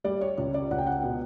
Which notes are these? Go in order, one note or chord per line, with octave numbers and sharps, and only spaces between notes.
G3 D5
C#5
C#2 C#5
D5
C#2 F#5
G5
F#5
B2